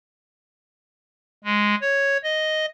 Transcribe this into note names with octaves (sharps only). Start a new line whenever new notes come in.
G#3
C#5
D#5